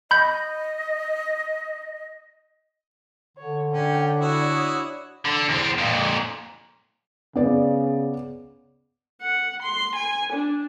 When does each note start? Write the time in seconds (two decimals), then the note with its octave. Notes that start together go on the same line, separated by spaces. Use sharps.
0.11 D#5 B5 G6
3.38 D3 C#5
3.73 C#4 D4 G5
4.20 E4 F#4 C#5 D#6
5.25 D3
5.49 E2 C4
5.78 F2 A#2
7.35 C#3 B3 D5
9.22 F#5
9.62 C6
9.96 G#5
10.33 D4